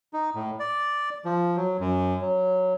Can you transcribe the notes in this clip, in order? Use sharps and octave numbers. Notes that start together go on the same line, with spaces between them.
D#4
A2
D5
F3
F#3
F#2
F#3